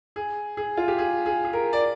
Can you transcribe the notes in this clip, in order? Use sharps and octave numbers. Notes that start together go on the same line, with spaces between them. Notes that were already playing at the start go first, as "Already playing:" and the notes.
G#4
G#4
F4
G4
G#4
G#4
G#4
A#4
D5